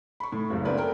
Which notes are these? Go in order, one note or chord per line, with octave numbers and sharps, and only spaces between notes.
B5 C#6
A2
F#1 C#2
B3 C4 D4 A#4 B4 D5
A4 A#4 G5